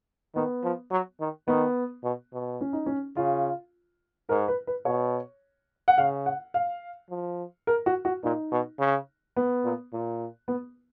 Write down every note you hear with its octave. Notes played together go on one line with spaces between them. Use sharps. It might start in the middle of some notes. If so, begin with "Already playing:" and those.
D#3 B3
F3
F#3
D#3
D#3 B3
B2
B2
C#4
D#4
C#4
C#3 F4
G#2 A#4
B4
B4
B2 C#5
F#5
C#3 F5
F#5
F5
F3
A#4
F#4
F#4
A#2 D#4
B2
C#3
B3
A#2
A#2
B3